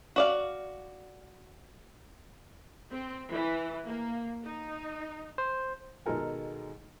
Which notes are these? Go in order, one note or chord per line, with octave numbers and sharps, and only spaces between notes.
F#4 D5 F5
C4
E3
A#3
D#4
C5
B2 D#3 G#3 A4 A#4 G#5